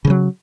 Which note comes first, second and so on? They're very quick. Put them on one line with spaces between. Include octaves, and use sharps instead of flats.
C#3 E3 F#3